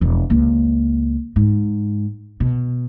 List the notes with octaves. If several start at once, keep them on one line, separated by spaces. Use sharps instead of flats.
E1 F2
C#2 A#3
G#2
B2